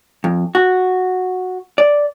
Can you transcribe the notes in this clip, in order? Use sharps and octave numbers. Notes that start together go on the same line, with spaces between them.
F2
F#4
D5